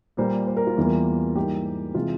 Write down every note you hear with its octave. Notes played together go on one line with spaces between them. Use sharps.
A#2 G3 A#3 C5
C5
A#4
F4
E2 E3 G3 A#3
G#2 E3 G3 A#3 G4
C3 E3 G#3 F4